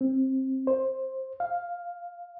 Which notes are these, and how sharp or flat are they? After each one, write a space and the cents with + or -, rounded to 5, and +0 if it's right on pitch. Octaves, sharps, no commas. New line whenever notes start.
C4 +15
C5 +15
F5 +5